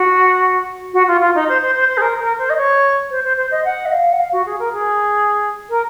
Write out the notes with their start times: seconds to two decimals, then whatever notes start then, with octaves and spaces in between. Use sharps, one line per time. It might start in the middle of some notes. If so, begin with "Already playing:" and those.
Already playing: F#4
0.93 F#4
1.07 F4
1.20 F4
1.34 D#4
1.48 C5
1.61 C5
1.75 C5
1.88 C5
1.97 G#4
2.01 A#4
2.20 A#4
2.38 C5
2.49 D#5
2.57 C#5
3.10 C5
3.24 C5
3.37 C5
3.51 D#5
3.64 F#5
3.85 D#5
3.91 F5
4.12 F#5
4.18 F5
4.32 F#4
4.46 G#4
4.59 A#4
4.73 G#4
5.69 A#4